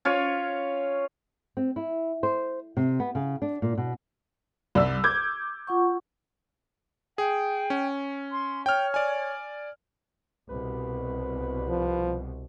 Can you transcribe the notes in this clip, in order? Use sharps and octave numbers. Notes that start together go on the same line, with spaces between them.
C#4 F4 C#5
C4
E4
C5
C3
B3
C#3
D4
A#2
B2
C2 D5 E6
D6 G6 G#6
F4 F#5 C#6
G#4 G5
C#4
C6
C#5 G5 F6
D5 G#5
C2 B2 B4
F3